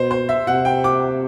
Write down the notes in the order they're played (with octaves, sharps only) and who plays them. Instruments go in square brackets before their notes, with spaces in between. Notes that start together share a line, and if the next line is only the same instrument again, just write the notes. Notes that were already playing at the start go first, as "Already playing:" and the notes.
Already playing: [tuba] B2 [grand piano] C5
[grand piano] C5
E5
[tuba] C3 [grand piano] F#5
[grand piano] G5
D6